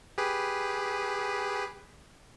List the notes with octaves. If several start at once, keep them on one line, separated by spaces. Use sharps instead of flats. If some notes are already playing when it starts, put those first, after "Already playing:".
G4 G#4 B4